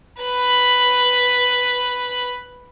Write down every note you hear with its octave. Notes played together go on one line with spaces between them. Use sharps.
B4 B5